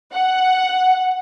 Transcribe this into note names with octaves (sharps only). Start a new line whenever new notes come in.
F#5